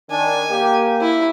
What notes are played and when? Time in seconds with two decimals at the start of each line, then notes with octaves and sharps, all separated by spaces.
0.11 D#3 D4 G#5
0.51 A#3 G4
1.01 E4